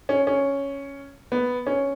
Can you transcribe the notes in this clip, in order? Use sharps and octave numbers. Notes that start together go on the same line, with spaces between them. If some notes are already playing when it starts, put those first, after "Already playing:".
C#4
C#4
B3
C#4